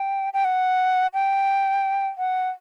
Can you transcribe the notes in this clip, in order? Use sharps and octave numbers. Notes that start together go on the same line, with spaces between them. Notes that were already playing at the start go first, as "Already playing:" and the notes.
Already playing: G5
G5
F#5
G5
F#5